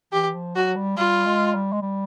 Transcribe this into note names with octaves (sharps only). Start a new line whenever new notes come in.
E3 G4
F3
F#3 F#4
G3
G3 F4
G#3
G3
G#3
G3